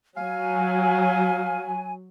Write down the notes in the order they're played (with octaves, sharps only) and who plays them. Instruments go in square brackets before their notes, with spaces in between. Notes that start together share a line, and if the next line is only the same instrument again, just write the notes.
[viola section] F#3 [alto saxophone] F5 [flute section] G#5